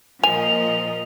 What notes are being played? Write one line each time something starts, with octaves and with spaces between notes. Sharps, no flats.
A#2 F3 A#4 D#5 G#5 F7